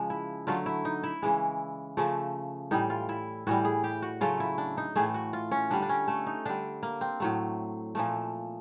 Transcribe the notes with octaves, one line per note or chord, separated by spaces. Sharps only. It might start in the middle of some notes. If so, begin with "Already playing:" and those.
Already playing: C#3 F3 G#3
E4
D3 F#3 A3 F4
E4
D#4
E4
C#3 E3 G#3
C#3 F3 A3
A2 E3 G3 D#4
F4
E4
A2 E3 G3 F#4
G#4
G4
F#4
C#3 F#3 A3 F4
E4
D4
D#4
A2 E3 A3 G#4
F#4
F4
C#4
D3 G3 D4
D4
C#4
A3
D#4
D3 G3 D4
A#3
C4
A2 F#3 A3
A#2 F3 A3